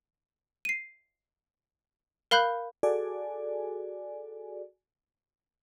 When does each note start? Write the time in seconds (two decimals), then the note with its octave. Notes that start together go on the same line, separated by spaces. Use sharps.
0.65 C7 D#7
2.31 A#4 F5 B5 F#6 G6
2.83 F#4 G#4 A4 D5 G#5